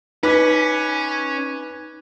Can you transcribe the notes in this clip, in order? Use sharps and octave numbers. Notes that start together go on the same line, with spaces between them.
C#4 D#4 B4 D6